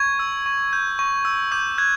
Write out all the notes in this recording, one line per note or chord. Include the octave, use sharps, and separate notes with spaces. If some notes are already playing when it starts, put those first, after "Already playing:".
Already playing: C#6 G#6
E6
C#6
G6
C#6
E6
D6 G6
F#6 G#6